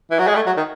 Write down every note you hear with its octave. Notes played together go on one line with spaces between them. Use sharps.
E3
F#3
G#3
A3
F#3
D#3